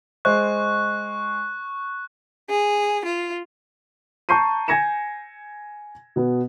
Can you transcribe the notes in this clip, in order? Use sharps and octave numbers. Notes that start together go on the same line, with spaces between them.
G#3 C5 C#6 F#6
G#4
F4
A5 A#5 C#6 G6 C7 D#7
G#5 G#6 A#6 C#7 E7
B2 B3